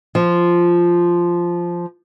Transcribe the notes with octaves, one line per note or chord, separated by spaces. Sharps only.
F3